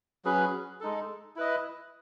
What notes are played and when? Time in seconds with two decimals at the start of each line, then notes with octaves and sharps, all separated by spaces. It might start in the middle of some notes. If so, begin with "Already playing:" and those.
0.25 F#3 C#4 G#4 B4
0.80 G#3 D#4 A4
1.36 E4 B4 D#5